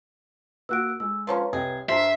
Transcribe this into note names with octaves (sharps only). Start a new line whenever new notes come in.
A#3 F#4 F#5 E6 F#6 D7
G#3 E6
D3 F3 C#4 B4 C#5 A#5
C2 G#4 D#5 G5
G2 A#4 C5 E5 A5 B6 C7